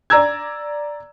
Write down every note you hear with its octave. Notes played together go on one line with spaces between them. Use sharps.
D5 A#5 E6 G#6